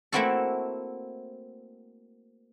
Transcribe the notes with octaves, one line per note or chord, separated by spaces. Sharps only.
A3 A#3 C4 E4 F#4 A4